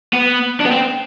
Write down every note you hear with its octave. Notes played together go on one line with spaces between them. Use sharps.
B3
D4
B3
C4